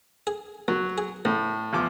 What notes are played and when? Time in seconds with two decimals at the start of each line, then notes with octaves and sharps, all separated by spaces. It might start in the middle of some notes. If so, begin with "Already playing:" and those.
0.27 G#4
0.68 D#2 F#3
0.98 G#4
1.25 A1 A2
1.73 E2 F3 D6